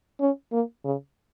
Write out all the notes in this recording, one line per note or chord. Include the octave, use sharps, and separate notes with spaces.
C#4
A#3
C#3